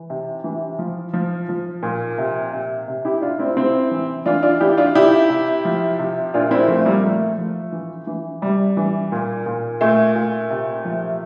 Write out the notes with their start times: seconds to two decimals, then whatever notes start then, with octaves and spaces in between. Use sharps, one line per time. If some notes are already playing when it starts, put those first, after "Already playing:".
Already playing: E3
0.10 C3
0.44 E3
0.79 F3
1.13 F3
1.49 F3
1.83 A#2
2.18 C3
2.53 C3
2.88 C3
3.05 E4 G4
3.21 C3 D4 F4
3.39 C4 E4
3.57 C3 C4 E4
3.91 E3
4.26 E3 D4 F4
4.43 D4 F4
4.60 E3 E4 G4
4.77 D4 F4
4.95 C3 E4 G4
5.30 C3
5.65 F3
5.99 C3
6.34 A#2 D4 F4
6.51 C4 E4
6.68 F3 A3 C4
6.85 G3 A#3
7.03 F3 A3
7.38 F3
7.72 E3
8.07 E3
8.42 C3 G3
8.77 E3
9.12 A#2
9.46 A#2
9.81 A#2 A3
10.16 A#2
10.50 C3
10.85 F3